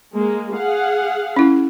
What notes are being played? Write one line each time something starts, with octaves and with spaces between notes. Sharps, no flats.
G#3 A#3
G#4 F5 F#5
C#4 E4